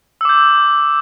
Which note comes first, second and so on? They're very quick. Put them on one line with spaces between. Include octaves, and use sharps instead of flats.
E6 D6 G6